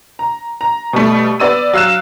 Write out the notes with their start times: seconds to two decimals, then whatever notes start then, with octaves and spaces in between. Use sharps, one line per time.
0.19 A#5
0.61 A#5
0.93 B2 G3 A3
1.40 B3 D5 E6 D#7
1.73 F#3 F5 E6 F#6 E7